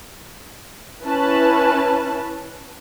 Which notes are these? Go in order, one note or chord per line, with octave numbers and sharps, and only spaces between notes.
C#4 E4 B4 A5